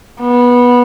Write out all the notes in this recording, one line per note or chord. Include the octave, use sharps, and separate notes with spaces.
B3